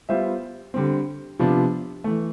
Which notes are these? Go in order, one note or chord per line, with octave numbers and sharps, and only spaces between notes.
G3 B3 F4 C5 E5
D3 G3 C4
C3 F3 B3 D4 F4
E3 A3